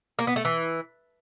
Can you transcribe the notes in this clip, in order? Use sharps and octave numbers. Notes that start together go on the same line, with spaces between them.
A#3
B3
A3
E3